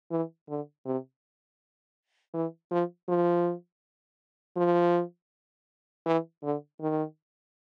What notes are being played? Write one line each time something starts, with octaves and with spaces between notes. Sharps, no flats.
E3
D3
C3
E3
F3
F3
F3
E3
D3
D#3